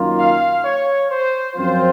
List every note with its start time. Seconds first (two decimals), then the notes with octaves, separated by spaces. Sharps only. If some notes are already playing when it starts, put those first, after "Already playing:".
Already playing: F#2 D#3 A#3 F4
0.19 F5
0.64 C#5
1.11 C5
1.56 F#2 F3 C4 F4 C5